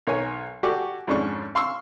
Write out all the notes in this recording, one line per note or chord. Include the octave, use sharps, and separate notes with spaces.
B1 A#4 C#5 G#5
F#4 G4 A4 D5 G#5 C#6
F2 G#2 C#4 D4 G#4 C#6
F5 C6 C#6 E6